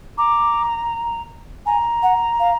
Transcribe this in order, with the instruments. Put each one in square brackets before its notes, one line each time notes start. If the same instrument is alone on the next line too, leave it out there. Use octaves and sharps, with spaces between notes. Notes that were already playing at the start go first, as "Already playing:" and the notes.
[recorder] A#5 [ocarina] D6
[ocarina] G#5 [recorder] A#5
[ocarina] F#5
F5